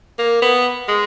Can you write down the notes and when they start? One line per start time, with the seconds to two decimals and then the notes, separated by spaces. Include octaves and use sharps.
0.18 A#3
0.42 B3
0.88 G#3